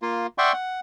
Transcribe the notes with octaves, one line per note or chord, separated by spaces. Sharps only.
A#3 F4
D5 E5 F#5 G5 C6 C#6
F#5